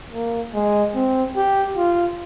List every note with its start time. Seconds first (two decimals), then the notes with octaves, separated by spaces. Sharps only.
0.12 A#3
0.55 G#3
0.95 C4
1.36 G4
1.77 F4